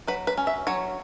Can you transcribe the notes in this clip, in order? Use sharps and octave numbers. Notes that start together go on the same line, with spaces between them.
F#3 B4
B4
C#4
E5
F#3 C#5